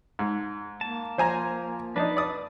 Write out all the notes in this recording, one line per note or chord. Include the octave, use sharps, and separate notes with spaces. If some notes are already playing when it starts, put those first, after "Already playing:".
G#2
A#3 A5
F3 C5 G#5 A#5
D4 D#4 B4 A5
D5 D#6